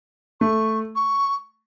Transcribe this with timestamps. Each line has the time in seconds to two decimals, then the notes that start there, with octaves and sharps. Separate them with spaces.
0.41 A3 C#6
0.96 C#6